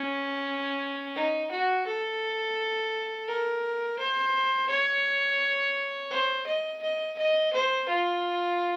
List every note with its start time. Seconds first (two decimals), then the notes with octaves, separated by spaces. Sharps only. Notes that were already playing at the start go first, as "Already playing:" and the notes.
Already playing: C#4
1.16 D#4
1.51 F#4
1.86 A4
3.28 A#4
3.99 C5
4.69 C#5
6.11 C5
6.47 D#5
6.82 D#5
7.18 D#5
7.53 C5
7.88 F4